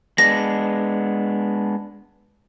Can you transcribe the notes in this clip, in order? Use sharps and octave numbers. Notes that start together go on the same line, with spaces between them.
G#3 B3 D4 A#6